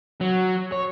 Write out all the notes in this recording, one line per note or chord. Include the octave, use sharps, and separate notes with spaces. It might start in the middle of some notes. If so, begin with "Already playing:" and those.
F#3
C#5